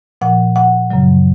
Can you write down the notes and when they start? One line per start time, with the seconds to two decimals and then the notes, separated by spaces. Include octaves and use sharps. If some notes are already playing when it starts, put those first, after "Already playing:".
0.21 A#2 F3 F#5
0.56 F#5
0.91 F#2 C#3 F#3